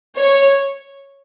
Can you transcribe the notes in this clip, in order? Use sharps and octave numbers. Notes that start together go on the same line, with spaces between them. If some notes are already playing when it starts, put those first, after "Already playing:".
C#5